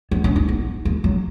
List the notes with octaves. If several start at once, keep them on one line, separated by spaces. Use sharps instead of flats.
B3
C#4
D#4
B3
A#3
F#3